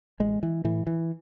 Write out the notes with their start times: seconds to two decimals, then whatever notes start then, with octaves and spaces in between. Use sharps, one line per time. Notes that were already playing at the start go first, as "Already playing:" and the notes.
0.20 A1 G#3
0.43 E3
0.64 A2 E3
0.87 E3